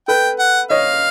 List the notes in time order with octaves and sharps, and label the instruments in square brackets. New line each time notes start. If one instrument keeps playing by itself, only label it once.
[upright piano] A4 B4 [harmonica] G5
[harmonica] F#5
[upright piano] C#5 D#5 [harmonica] F5